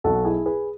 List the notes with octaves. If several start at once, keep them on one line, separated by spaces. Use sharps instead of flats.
B1 B2 F#3 F#4 A4
E4 G#4
G#4 B4